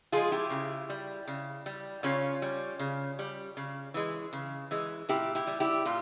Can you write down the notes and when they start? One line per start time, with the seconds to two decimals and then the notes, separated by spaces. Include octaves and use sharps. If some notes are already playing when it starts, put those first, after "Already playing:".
0.12 F3 G#3 F4 G#4
0.32 E4 G4
0.50 C#3
0.90 G3
1.28 C#3
1.66 G3
2.03 C#3 C#4 F4
2.42 G3
2.79 C#3
3.19 G3
3.57 C#3
3.94 E3 G#3
4.33 C#3
4.71 E3 G#3
5.09 A#2 E4 G4
5.35 E4 G4
5.47 G3
5.60 E4 G4
5.86 A#2 F4